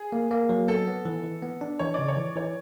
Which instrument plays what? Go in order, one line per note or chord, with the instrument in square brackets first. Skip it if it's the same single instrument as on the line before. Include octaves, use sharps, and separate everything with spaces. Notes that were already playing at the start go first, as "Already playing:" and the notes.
Already playing: [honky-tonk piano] G#4
[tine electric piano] A#3
A#3
F#3
[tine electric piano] B3 [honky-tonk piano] A4
[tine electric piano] B3
E3
E3
B3
D4
[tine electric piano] E3 [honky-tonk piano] C#5
[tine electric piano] C#3 [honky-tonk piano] D5
[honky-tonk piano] C#5
[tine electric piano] E3
[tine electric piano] E3 [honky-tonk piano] C#5